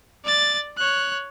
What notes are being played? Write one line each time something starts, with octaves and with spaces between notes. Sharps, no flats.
D5 A6
C#5 F#6